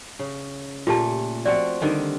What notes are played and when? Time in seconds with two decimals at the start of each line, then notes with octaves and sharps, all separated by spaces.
0.19 C#3
0.87 A#2 A3 F4 G4 A5
1.45 F3 C4 F#4 D5 G5
1.81 D3 D#3 G3